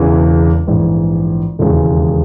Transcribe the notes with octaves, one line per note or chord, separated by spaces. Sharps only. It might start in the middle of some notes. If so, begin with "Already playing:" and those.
Already playing: E1 E2 C#3 E3
A#1 G#2 E3
E1 D#2 C#3 E3 G#3